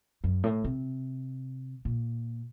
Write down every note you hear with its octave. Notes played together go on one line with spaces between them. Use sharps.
F#2
A2
C3
A#2